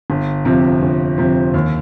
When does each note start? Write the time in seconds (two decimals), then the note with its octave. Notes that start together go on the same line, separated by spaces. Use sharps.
0.10 G1
0.45 F2 C3 F3
0.82 G1
1.18 F2 C3 F3
1.54 D#2